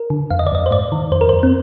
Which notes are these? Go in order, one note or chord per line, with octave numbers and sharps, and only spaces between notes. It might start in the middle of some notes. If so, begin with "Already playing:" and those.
Already playing: A#4
D3
F2 F5
D#5
D5
F2 D#5
C5
G#2 D5
D#3
F2 C5
A#4
F2 C5
C4